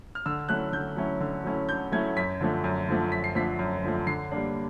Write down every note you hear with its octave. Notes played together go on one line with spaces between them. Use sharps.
F6
D3 E6
F#3 A3 C#4 E4 F#6
D3 G6
F#3 A3 C#4 E4
D3
F#3 A3 C#4 E4
D3 G6
F#3 A3 C#4 E4 G#6
F#2 B6
D3 F3 A3
F#2
D3 F3 A3
F#2 B6
C7
D3 F3 A3 B6
F#2
D3 F3 A3
D3 C7
G3 A#3 D4